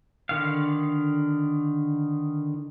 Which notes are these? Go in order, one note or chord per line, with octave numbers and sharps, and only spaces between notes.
D3 D#3 F5